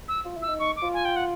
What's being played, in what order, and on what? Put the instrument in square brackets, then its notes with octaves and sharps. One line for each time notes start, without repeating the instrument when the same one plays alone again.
[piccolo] E6
[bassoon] F4
E4
[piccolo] E6
[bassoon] D#4
[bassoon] D#4 [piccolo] C#6
[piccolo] D6
[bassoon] F4
[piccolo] G#5
G5
F#5